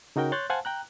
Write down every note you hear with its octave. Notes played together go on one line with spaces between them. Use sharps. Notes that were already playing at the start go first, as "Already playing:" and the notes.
C#3 D#4 F#4 A#4 G5
C#5 C6 F#6 G6 A6
C5 F5 F#5 G#5 A5
G5 A#5 F#6